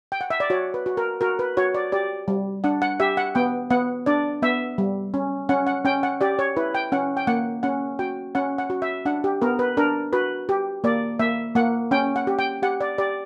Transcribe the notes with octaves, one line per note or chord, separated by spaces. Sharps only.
G5
F#5
E5
D5
F#4 C#5
B4
F#4
A#4
F#4 A#4
B4
F#4 C#5
D5
G4 D5
G3
D4 F#5
F#5
G4 E5
F#5
B3 G5
B3 F#5
D4 D5
B3 E5
G3
C#4
C#4 F#5
F#5
C#4 G5
F#5
G4 D5
C#5
E4 B4
G5
C#4 F#5
G5
A#3 F#5
C#4 F#5
F#4 G5
C#4 F#5
F#5
F#4
E5
D4 F#5
G4
B3 A#4
B4
D4 A#4
F#4 B4
G4
A#3 D5
A#3 E5
A#3 F#5
C#4 G5
F#5
G4
G5
G4 F#5
D5
G4 D5